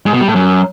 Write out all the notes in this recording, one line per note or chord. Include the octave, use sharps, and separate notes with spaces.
G#2
B2
G3
A2
F#2